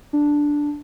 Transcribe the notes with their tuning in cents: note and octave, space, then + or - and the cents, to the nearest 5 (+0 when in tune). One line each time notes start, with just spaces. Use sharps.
D4 +0